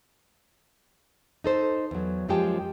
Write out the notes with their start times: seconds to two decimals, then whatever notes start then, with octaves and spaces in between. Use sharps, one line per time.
1.44 D#4 A4 C5
1.91 E2 F#3
2.29 F#2 F3 G#3 G4 G5 A5